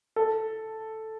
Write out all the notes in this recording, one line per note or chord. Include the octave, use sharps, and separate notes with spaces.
A4